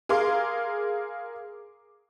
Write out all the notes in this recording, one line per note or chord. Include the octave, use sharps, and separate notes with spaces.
G#4 A#4 F5 C6 D6